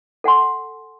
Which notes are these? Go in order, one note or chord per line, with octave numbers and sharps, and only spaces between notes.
A4 F#5 G#5 C6